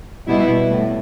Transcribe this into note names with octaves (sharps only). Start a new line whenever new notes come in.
B2 G3 B3 E4
A2